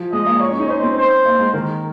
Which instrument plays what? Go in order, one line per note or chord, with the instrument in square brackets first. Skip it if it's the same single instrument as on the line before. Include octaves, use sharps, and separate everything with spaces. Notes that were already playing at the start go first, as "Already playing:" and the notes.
Already playing: [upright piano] F3
[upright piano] G#3 [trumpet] D#5
[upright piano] A#3
[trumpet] C#5
[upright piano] C#4
D#4
[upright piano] C#4 [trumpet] C5
[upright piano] C4
[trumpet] C5
[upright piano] A#3
G#3
[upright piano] D#3 [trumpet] A#4